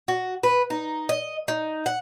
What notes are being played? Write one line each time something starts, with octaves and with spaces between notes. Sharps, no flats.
F#4
B4
D#4
D#5
D#4
F#5